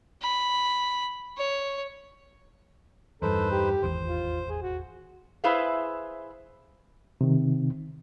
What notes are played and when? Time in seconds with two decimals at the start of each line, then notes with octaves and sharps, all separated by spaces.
0.22 B5
1.37 C#5
3.22 E2 G2 D#4 A4 B4 C5
3.51 G4
3.82 D#1 G#1 E2 C5
4.05 F4
4.49 G#4
4.62 F#4
5.44 E4 G#4 B4 C5 E5 F5
7.21 C3 D#3